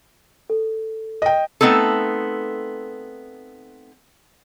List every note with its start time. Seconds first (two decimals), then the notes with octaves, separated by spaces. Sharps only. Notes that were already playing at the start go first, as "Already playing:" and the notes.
0.50 A4
1.22 D#5 G5
1.61 A3 B3 C4 D#4 A4